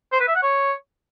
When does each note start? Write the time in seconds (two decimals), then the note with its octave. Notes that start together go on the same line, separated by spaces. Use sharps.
0.12 C5
0.20 B4
0.28 E5
0.35 F#5
0.43 C#5